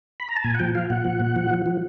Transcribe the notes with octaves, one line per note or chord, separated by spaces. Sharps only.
B5
A#5
A5
A#2 G#5
F#5
F3 G5
F3 F5
A#2 F#5
F3
A#2
F3
F3
F3